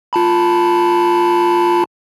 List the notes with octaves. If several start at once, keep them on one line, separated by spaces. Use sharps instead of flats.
F4 A5 B5